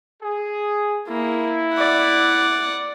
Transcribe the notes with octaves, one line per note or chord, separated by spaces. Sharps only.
G#4
A#3 E4
D5 F#5